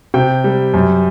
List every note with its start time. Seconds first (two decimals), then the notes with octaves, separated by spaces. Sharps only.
0.14 C3 G5
0.44 G3
0.74 F#2